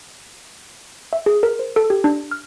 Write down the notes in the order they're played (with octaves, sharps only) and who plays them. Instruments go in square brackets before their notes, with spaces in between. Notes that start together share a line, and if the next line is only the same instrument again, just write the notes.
[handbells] E5
G#4
A#4
C5
A4
G4
D4
F6